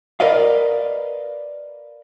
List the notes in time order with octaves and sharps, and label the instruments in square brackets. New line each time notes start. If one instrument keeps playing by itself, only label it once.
[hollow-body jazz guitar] A#4 B4 D5 D#5 F5